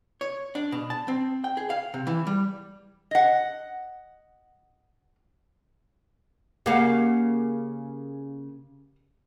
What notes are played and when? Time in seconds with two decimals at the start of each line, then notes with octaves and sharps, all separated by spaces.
0.21 C#5
0.55 D4
0.72 B2
0.90 A5
1.08 C4
1.44 G5
1.57 G#4
1.70 F5
1.94 C3
2.07 E3
2.27 G3
3.11 D#5 F#5
6.66 C#3 A#3 G4 F5 F#5